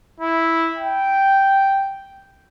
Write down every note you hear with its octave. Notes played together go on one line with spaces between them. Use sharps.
E4
G5